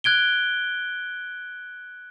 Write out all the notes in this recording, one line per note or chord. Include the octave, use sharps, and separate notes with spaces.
F#6 G#6 D7 G7